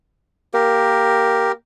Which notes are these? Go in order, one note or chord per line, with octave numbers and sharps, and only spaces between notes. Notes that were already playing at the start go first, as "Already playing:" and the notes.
A#3 G4 A#4